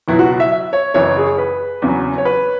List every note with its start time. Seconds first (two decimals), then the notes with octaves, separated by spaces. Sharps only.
0.08 C#2 B2 F#3 B3 E4
0.19 F#4
0.40 E5
0.52 E5
0.73 C#5
0.94 F#1 F#2 E3 C#5
1.17 G#4
1.38 B4
1.82 E2 C#3 F#3
2.18 C#5
2.25 B4